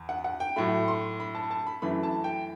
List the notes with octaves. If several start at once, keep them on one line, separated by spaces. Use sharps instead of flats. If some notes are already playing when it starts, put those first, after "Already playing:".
Already playing: E2
F#5
F#5
G5
A2 F#3 A3 B5
C6
B5
A5
A5
B5
F#2 E3 A3 B5
A5
G5